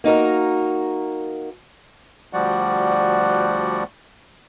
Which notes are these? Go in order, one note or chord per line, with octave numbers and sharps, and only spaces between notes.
A#3 D#4 F#4 A#4
D2 F3 G3 F#4 D5 F#5